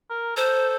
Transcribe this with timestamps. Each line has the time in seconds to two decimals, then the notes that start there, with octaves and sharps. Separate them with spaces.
0.10 A#4
0.36 A4 C5